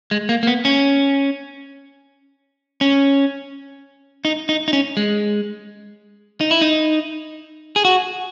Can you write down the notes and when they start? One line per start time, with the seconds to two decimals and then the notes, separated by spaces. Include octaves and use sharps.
0.11 G#3
0.29 A#3
0.43 A#3
0.47 B3
0.65 C#4
2.81 C#4
4.25 D#4
4.49 D#4
4.68 D#4
4.73 C#4
4.97 G#3
6.41 D#4
6.51 E4
6.61 D#4
7.76 G#4
7.85 F#4